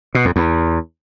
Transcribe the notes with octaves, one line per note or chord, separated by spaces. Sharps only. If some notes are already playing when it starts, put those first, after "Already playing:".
B2
F2
E2